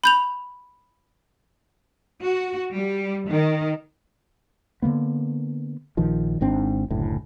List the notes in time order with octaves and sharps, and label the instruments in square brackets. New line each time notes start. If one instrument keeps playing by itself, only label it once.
[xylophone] B5 G6 F7
[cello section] F#4
G3
D#3
[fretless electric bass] D3 E3 A#3 B3
A#1 D#3 F3
G#1 G#2 C4 D4
F#1 D2 A2